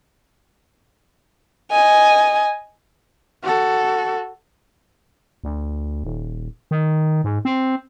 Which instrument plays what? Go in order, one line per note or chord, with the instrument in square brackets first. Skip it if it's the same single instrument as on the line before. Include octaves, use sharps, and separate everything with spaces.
[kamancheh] D#5 G#5
[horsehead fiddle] F#4 A4
[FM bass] D2
D#1
D#3
G#2
C4